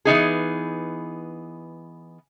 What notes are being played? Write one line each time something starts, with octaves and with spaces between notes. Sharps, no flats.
E3 B3 D#4 G#4